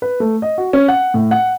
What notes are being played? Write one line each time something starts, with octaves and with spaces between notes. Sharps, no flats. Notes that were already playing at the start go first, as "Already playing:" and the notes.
B4
A3
D#5
F#4
C#4
F#5
A2
F#5